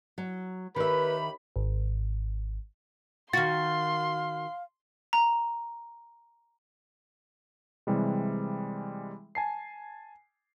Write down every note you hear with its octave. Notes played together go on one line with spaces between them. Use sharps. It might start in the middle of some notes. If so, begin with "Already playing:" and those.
F#3
D#2 D#3 G4 B4 E5 B5
G#1
D#3 F#4 F5 C6 A6
A#5
C3 E3 G3 G#3
G#5 A5 C7